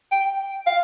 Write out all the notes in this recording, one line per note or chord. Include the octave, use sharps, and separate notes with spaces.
G5
F5